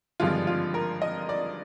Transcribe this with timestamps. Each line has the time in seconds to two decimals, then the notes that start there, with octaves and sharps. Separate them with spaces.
0.20 G#1 G2 D3 F3 G#3 F4
0.47 F4
0.74 A#4
1.02 D#5
1.29 D5